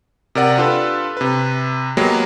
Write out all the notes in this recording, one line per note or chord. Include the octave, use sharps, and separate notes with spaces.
C3 A#4 D5 F#5
D4 F4 G4 A4 B4
C3 B4
F#3 G#3 A#3 B3 G4